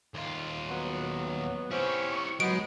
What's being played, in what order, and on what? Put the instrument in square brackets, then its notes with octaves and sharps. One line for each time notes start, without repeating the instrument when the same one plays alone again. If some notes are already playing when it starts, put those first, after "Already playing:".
[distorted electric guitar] D#2 F4
[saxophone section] F#3 B3
[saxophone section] B3 C#4 C5 [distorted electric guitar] E4 G4 [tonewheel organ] C#6
[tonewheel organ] F#3 [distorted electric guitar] G#3 [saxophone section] B3 D#4 [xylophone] D7